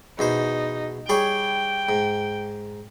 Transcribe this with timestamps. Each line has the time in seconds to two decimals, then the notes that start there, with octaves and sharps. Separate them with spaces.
0.19 E2 B2 D#4 C5
1.09 G3 G#4 C#5 G5
1.89 G#2